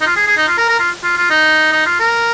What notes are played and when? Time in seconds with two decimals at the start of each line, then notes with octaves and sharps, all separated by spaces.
0.01 D#4
0.06 F4
0.16 G#4
0.27 G#4
0.37 D#4
0.48 F4
0.58 A#4
0.69 A#4
0.79 F4
1.04 F4
1.17 F4
1.31 D#4
1.72 D#4
1.86 F4
2.00 A#4